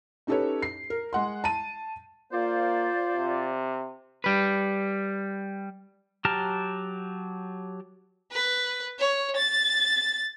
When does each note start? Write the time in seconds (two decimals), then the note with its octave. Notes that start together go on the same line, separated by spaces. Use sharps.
0.27 C#4 D#4 G4 A4 B4 C#5
0.62 C7
0.90 A#4
1.13 G#3 F#5 C6
1.44 A5 D#7
2.33 A#3 F4 C5 D5
3.12 C3
4.24 G3 B4
6.25 F#3 G4 A5 A#5 F6
8.32 B4
8.99 C#5
9.36 A6